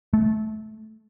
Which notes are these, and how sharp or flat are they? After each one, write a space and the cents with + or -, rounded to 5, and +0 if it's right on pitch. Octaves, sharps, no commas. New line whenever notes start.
A3 -20